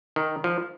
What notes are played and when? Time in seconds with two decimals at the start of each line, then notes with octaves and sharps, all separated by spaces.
0.16 D#3
0.44 F3